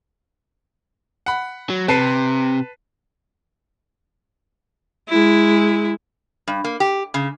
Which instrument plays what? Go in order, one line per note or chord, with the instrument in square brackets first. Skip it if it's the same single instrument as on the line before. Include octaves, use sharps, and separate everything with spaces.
[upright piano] F#5 B5
[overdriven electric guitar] F#3
[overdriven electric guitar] C3 [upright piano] B4 A5 C7
[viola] G#3 E4
[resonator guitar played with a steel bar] G2
A#3
G4
C#3